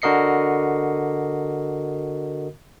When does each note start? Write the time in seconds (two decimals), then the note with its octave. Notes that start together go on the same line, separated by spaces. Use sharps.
0.02 D3 F#4 A#4 D#5 C7 C#7